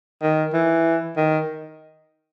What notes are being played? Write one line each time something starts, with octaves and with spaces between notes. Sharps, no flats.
D#3
E3
D#3